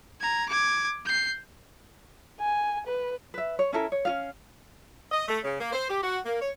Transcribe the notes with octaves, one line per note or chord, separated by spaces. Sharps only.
A#5 G#6
D6 G#6
G6 C7
G#5
B4
B4 E5
C#5
C#4 E4 A4 A#4
C#5
C#4 F4 F5
D#5
A3
C#3
A#3
C5
G4
F#4
A#3
C#5